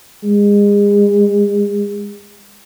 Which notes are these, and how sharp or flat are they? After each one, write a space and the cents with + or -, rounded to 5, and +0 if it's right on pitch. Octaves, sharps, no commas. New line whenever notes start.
G#3 -35